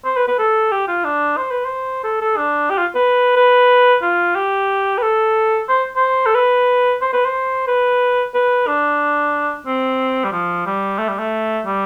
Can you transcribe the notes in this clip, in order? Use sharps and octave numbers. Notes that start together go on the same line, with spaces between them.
C5
B4
B4
A4
G4
F4
D4
C5
B4
C5
A4
A4
D4
G4
F4
B4
B4
F4
G4
B4
A4
C5
C5
A4
B4
C5
B4
C5
B4
B4
D4
C4
G3
F3
G3
A3
G3
A3
G3